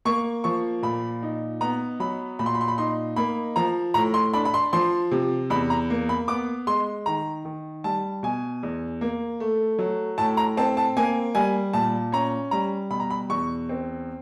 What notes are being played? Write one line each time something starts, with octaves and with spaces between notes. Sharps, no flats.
A#3 C#6
F3 C#6
A#2 B5
D#4
B3 A#5
F#3 B5
A#2 B5
C6
B5
C6
B5
D#4 C6
A#3 B5
F3 A#5
A2 A#5
C6
D4 B5
B5
C6
F3 C6
C3
E2 B5
A#5
A#3
B5
B3 D6
G#3 C6
D#3 A#5
D#3
G3 A5
B2 G#5
E2
A#3
A3
F#3
A2 A5
A#5
C4 A5
A5
A#3 G#5
G3 G#5
A#2 A5
C#4 A#5
G3 A#5
B2 B5
A#5
B5
E2 C#6
C4